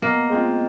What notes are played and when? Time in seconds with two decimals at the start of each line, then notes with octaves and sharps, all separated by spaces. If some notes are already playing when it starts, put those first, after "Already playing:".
0.02 B2 A#3
0.29 G#3 C4 F4